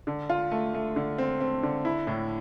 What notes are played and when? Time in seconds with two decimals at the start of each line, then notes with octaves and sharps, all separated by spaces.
0.07 D3
0.30 F4
0.51 A3
0.74 A3
0.96 D3
1.18 C4
1.40 C4
1.63 D3
1.85 E4
2.07 A2